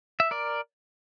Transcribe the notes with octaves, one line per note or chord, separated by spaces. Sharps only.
E5
A#4 D5